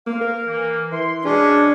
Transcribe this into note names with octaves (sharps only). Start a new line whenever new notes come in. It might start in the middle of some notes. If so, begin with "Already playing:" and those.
A#3 F5
A#4
E3 A#3
E3 C6
B2 G#3 C#4 D4 G#4